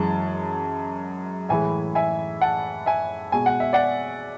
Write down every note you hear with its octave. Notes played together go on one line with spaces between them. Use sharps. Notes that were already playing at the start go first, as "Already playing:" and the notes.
Already playing: F#2 E3 G#3 A5
A2 E3 G#3 E5 G#5
E5 G#5
F#5 A5
E5 G#5
B2 G#3 G#5
F#5
E5
D5 F#5